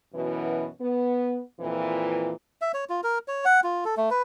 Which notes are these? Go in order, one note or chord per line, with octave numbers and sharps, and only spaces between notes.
F#2 B2 E3
B3
F2 A#2 E3
E5
C#5
F4
A#4
C#5
F#5
F4
A4
A3
B4